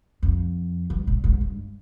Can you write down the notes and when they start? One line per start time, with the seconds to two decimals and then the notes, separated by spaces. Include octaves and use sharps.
0.22 F2
0.90 G2
1.07 A#2
1.24 G#2
1.41 G2